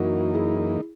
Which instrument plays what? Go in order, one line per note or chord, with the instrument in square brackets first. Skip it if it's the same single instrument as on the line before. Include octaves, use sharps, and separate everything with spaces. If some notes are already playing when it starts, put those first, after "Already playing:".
Already playing: [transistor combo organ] F#2 E3 A#3 D#4 [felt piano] F#4 A#4
[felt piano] E4 G#4